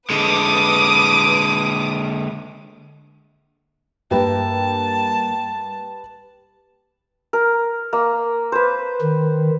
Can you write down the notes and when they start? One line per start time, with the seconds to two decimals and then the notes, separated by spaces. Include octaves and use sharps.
0.10 D3 G#3 B4 D6 D#6
4.11 G2 A#3 G4 B4 E5 G5 A5
7.33 A#4
7.93 A#3
8.52 B4 C5
9.01 D#3